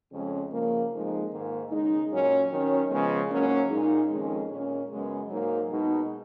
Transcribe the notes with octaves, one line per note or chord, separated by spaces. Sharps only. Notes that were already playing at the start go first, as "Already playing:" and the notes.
F2 C#3 G#3 C#4
C#3 F3 A#3
F2 F3 G#3 D#4
G#2 D#3 A#3
C#3 G#3 D#4
A#2 F#3 C#4
D#3 F#3 C#4
C#3 F3 G#3 B3
G#2 F#3 A#3 C#4
A#2 G#3 D#4
F2 D#3 G#3 C#4
A#2 G#3 C#4
F#2 C#3 G#3 B3
G#2 F#3 A#3 D#4
B2 G#3 D#4